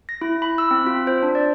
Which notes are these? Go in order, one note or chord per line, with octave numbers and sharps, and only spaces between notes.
A#6
E4
B5
E6
C4
F4
C5
D4
D5